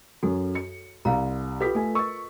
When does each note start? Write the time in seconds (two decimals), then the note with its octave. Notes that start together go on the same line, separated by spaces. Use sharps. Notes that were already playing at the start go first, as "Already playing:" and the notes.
0.23 F#2 F#3 F#4 A4
0.55 C#7
1.05 C2 F5 A#5
1.60 F4 G4 A4 B4 B6
1.75 A3 A4 G#5
1.95 A#4 D#5 C#6